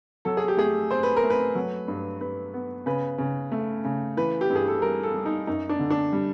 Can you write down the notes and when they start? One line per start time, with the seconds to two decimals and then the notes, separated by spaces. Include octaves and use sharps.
0.25 F#3 A4
0.37 G#4
0.48 G4
0.57 A3 G#4
0.90 C4 C5
1.03 B4
1.16 A#4
1.23 A3
1.30 B4
1.55 F#3
1.88 G2
2.21 G2 B4
2.54 B3
2.86 C#3 B4
3.18 C#3
3.52 A3
3.85 C#3
4.17 E3 B4
4.41 G4
4.50 G2
4.55 G#4
4.68 A4
4.82 G3 A#4
5.03 A4
5.15 G3
5.26 D#4
5.47 F#2 D#4
5.69 D4
5.79 D3
5.90 D4
6.13 G3